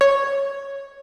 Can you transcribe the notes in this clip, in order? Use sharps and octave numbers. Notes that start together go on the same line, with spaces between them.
C#5